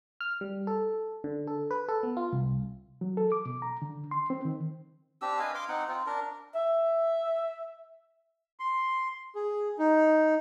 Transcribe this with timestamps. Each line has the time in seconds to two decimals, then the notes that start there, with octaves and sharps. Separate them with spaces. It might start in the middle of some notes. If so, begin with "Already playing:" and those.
0.21 F6
0.41 G3
0.67 A4
1.24 D3
1.47 A4
1.71 B4
1.88 A4
2.03 B3
2.17 F4
2.33 C2
3.01 F#3
3.17 A4
3.32 D6
3.46 B2
3.62 A#5
3.82 D3
4.11 C6
4.30 C4
4.45 D#3
5.21 C4 D4 G4 E6
5.40 B4 D#5 F5 G#5
5.55 F5 C6 D6
5.69 C4 D#4 F#5
5.88 C4 F4
6.06 D4 A#4
6.53 E5
8.60 C6
9.35 G#4
9.79 D#4